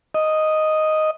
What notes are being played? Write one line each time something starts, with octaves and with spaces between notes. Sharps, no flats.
D#5